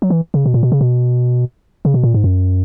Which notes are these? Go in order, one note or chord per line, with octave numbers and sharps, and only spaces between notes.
F#3
E3
C#3
B2
A#2
B2
C#3
B2
C#3
B2
A#2
G#2
F#2